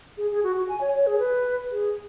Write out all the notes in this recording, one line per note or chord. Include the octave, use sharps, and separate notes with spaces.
G#4
G#4
F#4
F#4
G#5
C#5
C#5
G#4
B4
G#4